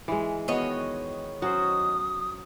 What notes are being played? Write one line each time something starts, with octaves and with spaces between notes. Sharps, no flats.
E3 G#3
D#3 B3 F#4 C#5 D#5
F#3 C#4 F#4 C5 D#6